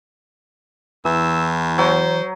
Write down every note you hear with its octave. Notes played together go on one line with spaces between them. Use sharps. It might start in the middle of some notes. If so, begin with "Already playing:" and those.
E2 E3 E6
F#3 C5